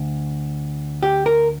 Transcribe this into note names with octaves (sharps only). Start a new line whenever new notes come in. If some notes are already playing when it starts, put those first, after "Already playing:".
Already playing: D2
G4
A#4